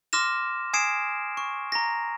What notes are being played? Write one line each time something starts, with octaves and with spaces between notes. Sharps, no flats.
C6 D6 F6 A#6 E7
G#5 D#6 G#6 C7 D7 E7
C#6
A#5 A#6